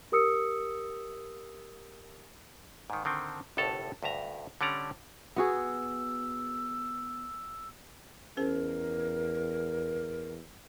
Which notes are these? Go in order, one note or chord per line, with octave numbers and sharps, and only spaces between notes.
G4 A#4 D#6 E6 C#7
G#2 D#3
D3 D#3 C4
G1 C2 A2 A4 A5 A#5
D2 G2 E5 A#5
D3 G3 C#4 D5 A#5
B3 F#4 G#4 E6
E2 C#4 G#4 A#4 C5